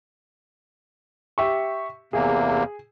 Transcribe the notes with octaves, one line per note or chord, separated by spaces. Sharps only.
G4 E5 C#6
E2 C3 A#3 G#4